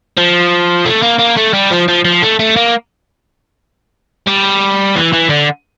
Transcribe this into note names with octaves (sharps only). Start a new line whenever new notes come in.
F3
A3
A#3
A#3
A3
G3
F3
F3
F3
A3
A3
A#3
G3
E3
E3
D3